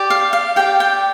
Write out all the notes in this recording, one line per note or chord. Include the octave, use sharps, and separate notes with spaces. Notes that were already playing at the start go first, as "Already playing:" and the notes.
Already playing: G4 D5
F5
F5
G4 D5 G5
G5